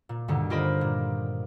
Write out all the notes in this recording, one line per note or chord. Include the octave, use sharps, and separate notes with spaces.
A#2
D2 G2 B2 D3 D#3
F4 G4 A#4 C5 D#5 B5
A#2